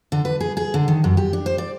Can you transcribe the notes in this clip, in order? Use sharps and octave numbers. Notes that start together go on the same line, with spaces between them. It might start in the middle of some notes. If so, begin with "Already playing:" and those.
D3
B4
G#4
G#4
D3
D#3
F#2
G4
D4
C5
D5